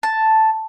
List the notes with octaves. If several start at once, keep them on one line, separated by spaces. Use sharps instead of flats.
A5